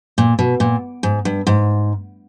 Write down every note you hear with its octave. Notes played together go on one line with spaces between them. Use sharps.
A#2
B2
A#2
G#2
G2
G#2